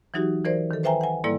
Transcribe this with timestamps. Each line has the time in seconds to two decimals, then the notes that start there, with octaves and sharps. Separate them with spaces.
0.14 E3 F#3 D#4 F#4 G4
0.44 E3 A#4 C5 D5
0.71 D#3 A4
0.83 B4 C5 E5 G5 G#5 A#5
1.01 F#5 G#5
1.24 G#2 G3 A#3 E4 A4 D5